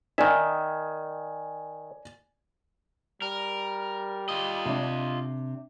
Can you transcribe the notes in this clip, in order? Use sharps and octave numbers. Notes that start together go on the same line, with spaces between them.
D#3 D5 E5 G#5
G3 A#4
F4 D#5
C3 D4